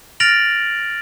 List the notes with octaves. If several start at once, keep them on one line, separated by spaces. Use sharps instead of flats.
F6 A6 A#6 D7 F7 F#7